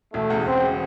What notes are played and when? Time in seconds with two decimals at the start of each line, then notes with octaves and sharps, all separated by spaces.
0.14 E1 A3
0.30 E2 C#3
0.46 E1 C4
0.63 C#3